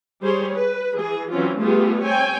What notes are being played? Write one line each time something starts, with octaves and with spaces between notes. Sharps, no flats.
G3 G#4 C5 C#5
B4
E3 G#4
E3 F#3 C4 C#4 F4
G3 A3 B3 F4 G4 G#4
C4 C#5 G5 G#5